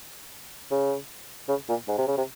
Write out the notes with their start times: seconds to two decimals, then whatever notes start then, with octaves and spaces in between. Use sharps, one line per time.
0.71 C#3
1.49 C#3
1.69 A#2
1.88 G#2
1.98 C3
2.07 C#3
2.18 C3